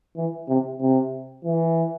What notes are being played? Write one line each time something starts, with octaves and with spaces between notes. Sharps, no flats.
E3
C3
C3
E3